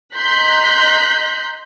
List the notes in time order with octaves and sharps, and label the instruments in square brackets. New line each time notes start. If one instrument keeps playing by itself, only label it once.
[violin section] D#5 A#5 C6 F#6 G6 B6